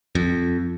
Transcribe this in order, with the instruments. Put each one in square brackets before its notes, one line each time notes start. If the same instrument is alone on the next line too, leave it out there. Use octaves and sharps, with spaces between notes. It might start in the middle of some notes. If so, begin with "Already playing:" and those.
[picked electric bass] F2